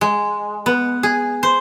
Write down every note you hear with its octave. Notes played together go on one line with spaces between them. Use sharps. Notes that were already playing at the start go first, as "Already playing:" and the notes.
G#3
B3
G#4
C5